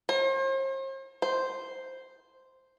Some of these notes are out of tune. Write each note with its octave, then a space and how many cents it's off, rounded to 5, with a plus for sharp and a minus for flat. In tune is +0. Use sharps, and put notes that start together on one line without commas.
C5 +40
C5 -5